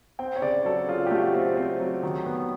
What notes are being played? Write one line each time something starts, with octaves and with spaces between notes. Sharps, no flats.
C4 G5
C#5
C#3 D5
F#3 A4
C#3 F4
G4
A3 F#4
C4
C4
F#3
D#3
B3